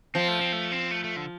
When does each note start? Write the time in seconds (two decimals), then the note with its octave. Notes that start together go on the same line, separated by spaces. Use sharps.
0.15 F3 C4
0.28 A3
0.41 C4
0.53 A3
0.72 C4
0.91 A3
1.04 A3
1.17 D3